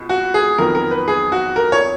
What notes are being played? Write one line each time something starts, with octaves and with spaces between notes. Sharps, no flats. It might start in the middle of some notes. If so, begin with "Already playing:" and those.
Already playing: C#2 B2
F#4
G#4
F2 D#3 F#3 B3 A#4
A#4
B4
G#4
F#4
A#4
C#5